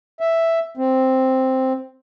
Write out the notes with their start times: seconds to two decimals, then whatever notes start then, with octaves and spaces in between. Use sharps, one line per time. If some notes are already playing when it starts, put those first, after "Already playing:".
0.20 E5
0.77 C4